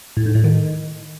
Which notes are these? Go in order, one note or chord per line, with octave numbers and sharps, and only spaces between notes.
A2
G#2
A2
D#3